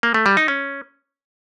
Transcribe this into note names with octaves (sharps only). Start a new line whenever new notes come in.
A#3
A3
G3
D#4
C#4